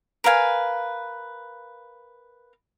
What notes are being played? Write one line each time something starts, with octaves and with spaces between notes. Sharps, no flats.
A#4 B4 F5 G#5